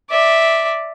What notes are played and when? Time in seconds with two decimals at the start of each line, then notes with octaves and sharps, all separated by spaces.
0.10 D5 E5